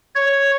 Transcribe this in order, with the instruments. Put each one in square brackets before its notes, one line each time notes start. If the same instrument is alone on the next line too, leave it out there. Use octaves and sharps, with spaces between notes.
[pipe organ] C#5